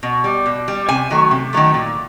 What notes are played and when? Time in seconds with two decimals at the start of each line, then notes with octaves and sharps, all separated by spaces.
0.03 B2
0.24 G3
0.46 B2
0.68 G3
0.89 C3 G#5
1.10 D#3 F#3 A3
1.31 C3
1.53 D#3 F#3 A3
1.74 A#2